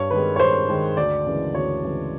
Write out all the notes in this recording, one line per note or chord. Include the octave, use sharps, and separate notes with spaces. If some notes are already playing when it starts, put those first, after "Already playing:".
Already playing: G2 C#5
D#3 G#3 B4
C#5
G2 C5
D#3 G#3
D2 D5
C#3 E3 G#3
D2 C#5
C#3 E3 G#3